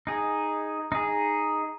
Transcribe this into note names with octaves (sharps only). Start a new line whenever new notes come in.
D#4 G#4
D#4 G#4